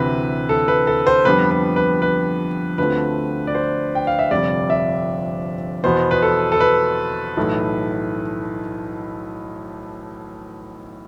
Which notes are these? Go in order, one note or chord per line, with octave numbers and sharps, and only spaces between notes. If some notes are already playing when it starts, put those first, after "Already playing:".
Already playing: D2 C3 E3 B4
A4
B4
A4
C5
F2 D3 G3 B3 B4
B4
B4
B4
D2 D3 F3 A3 C4 B4
D5
C5
G5
F5
E5
G1 F2 C3 G3 D5
E5
E2 B2 B3 C5
B4
A4
A4
B4
B1 A2 E3 A3